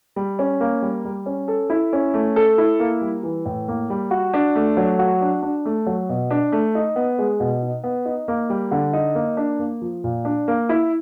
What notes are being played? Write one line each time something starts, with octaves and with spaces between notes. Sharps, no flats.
G3
C#4
A#3
G3
G3
C#4
A4
E4
C#4
A3
A4
E4
A#3
G3
E3
A2
A#3
G3
F#4
D4
A3
F#3
F#4
D4
D4
A3
F#3
B2
D4
A3
D#4
B3
G#3
B2
D#4
B3
D#4
A#3
G3
D3
D#4
A#3
D4
A#3
F3
A#2
D4
A#3
E4